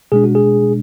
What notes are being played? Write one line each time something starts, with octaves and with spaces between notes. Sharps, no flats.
B2 G#3 D4 G#4
F#4
G#4